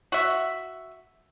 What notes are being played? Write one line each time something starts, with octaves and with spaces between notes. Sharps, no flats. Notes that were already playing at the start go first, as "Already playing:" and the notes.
F#4 E5